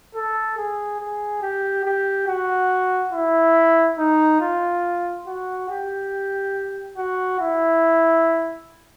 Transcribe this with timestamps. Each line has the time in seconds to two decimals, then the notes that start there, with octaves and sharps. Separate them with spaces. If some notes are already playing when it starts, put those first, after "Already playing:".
0.15 A4
0.57 G#4
1.00 G#4
1.42 G4
1.85 G4
2.28 F#4
3.13 E4
3.98 D#4
4.41 F4
5.27 F#4
5.70 G4
6.97 F#4
7.40 E4